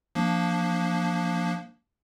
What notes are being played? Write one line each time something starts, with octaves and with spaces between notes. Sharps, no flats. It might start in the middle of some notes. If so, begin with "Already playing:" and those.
F3 A#3 D4